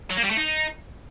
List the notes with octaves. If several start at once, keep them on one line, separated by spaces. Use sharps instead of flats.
F#3
A#3
G3
A3
D#4